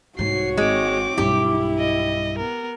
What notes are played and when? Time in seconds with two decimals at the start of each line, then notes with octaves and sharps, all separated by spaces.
0.19 C2 G#2 F#4 C#5 C7
0.57 G#1 G#3 C4 D6
1.18 B1 G2 E4 G4
1.79 D#5
2.39 B3 A#4